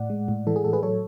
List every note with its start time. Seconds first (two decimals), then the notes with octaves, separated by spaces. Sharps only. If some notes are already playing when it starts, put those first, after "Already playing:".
Already playing: A2 D5 F#5
0.10 G#3
0.28 A2
0.47 E3 A4
0.56 G#4
0.64 A2 A4
0.73 G#4 B4
0.83 F#3 A4 C#5